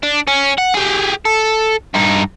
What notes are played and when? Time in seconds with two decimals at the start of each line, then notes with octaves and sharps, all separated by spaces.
0.03 D4
0.27 C#4
0.58 F#5
0.74 G4 G#4
1.25 A4
1.95 G2 D#4